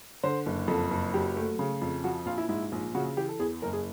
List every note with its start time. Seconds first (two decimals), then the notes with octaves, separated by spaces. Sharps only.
0.23 D3 C5
0.46 F#1
0.68 F2 A4
0.91 F#1
1.14 F#3 G4
1.36 A3
1.59 C#3
1.82 F2
2.04 F3 F#4
2.26 A#1 F4
2.38 E4
2.49 G#2 E4
2.72 A#1
2.95 C#3 F#4
3.17 E3 G4
3.29 A4
3.39 E2 G#4
3.62 F#1 A#4
3.73 G#4